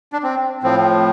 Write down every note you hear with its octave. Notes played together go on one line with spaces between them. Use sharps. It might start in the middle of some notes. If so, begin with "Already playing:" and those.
D4
C4
A2 F3 C4